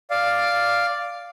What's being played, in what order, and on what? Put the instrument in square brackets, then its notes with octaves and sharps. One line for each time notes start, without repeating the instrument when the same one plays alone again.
[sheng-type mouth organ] D5 F5